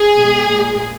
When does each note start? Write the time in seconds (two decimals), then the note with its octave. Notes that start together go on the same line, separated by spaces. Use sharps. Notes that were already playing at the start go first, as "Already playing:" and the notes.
Already playing: G#4
0.18 B2 G#3
0.48 A#2 G#3